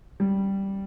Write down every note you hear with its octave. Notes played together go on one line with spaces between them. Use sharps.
G3